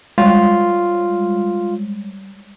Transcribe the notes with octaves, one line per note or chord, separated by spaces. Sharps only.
G3 G#3 F4